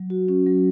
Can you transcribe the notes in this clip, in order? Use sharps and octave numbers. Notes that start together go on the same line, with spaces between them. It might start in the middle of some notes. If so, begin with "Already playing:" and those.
Already playing: F#3
F#4
C#4
F#3